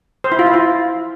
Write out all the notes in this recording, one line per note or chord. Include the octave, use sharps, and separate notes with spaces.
C5
E4
F4
E4
F4